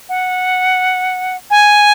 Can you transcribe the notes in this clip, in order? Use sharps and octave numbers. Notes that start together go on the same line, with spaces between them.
F#5
G#5